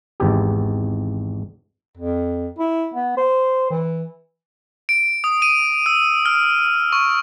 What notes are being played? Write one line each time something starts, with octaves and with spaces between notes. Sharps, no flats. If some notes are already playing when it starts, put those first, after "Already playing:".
G#1 E2 G4
F2
E4
B3
C5
E3
D7
D#6
D#7
E6
F6
C#6